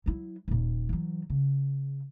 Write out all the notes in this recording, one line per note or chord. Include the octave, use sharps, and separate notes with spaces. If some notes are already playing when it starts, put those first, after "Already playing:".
F#3 E4
D#1 A#2
E3 F#3
C#3